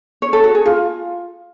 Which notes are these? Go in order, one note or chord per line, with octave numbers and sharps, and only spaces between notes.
C#5
A4
F#4
G#4
F4